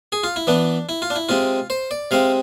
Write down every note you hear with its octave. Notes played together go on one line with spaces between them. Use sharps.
G#4
F4
E4
E3 B3 D4
E4
F4
D4
E4
C3 G#3 C4 F4
C5
D5
C3 G#3 C4 F5